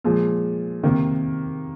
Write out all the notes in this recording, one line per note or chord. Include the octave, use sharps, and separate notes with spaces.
A#2 F3 G#3
C3 D#3 A#3